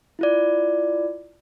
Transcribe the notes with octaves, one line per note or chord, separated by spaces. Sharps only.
E4 F4 D5